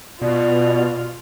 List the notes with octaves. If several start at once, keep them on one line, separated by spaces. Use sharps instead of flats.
B2 F4 D5